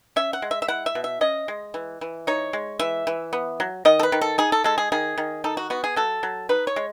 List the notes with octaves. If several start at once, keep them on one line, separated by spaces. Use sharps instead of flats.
C#4 E5
F#5
G#3
E5
E5
E4 F#5
E5
B2
E5
C#4 D#5
G#3
E3
E3
D#4 C#5
G#3
E3 E5
E3
B3
F#3
D#3 D#5
A4
B4
D#3
A4
D#4 G#4
A4
G#3 A4
G#4
D#3 G#4
D#3
D#4 A4
F#4
B3 F#4
G#4
F#3 A4
F#3
D#4 B4
C#5
G#3